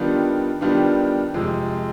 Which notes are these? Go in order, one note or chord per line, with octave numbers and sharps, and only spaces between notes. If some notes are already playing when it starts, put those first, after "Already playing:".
Already playing: D#3 G3 B3 D4 F4
D#3 G3 B3 D4 F4
F2 C3 F3 G#3